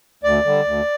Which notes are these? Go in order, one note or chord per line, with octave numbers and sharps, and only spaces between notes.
D2 D5
D3 G3
D2